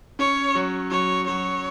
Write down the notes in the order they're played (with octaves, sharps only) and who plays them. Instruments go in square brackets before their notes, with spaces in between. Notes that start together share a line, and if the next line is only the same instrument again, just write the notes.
[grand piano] C#4 [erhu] C#5
[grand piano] F#3
[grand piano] F#3 [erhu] C#5
[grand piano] F#3 [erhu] C#5